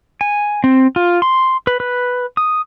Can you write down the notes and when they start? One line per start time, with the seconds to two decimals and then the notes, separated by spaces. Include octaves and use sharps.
0.21 G#5
0.64 C4
0.96 F4
1.22 C6
1.67 B4
1.80 B4
2.37 D#6